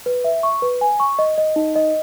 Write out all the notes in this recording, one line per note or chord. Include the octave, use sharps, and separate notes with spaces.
B4
E5
C#6
B4
G#5
C#6
D#5
D#5
D#4
D#5